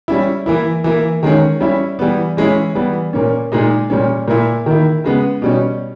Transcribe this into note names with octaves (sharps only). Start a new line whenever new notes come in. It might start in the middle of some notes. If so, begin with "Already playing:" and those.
G3 C#4 E4
E3 A#3 E4
E3 A#3 E4
D#3 G#3 C#4
G3 C#4 E4
E3 G3 B3
E3 G#3 C#4 E4
E3 G3 B3
A#2 A#3 C#4
A#2 G#3 D#4
A#2 G3 C#4
A#2 A#3 E4
D#3 A#3 E4
C#3 G#3 B3
B2 G3 C#4